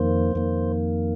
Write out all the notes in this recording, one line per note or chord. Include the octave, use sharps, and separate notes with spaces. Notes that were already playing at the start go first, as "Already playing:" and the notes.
Already playing: F2 D#3 A#3 C5
F2 D#3 A#3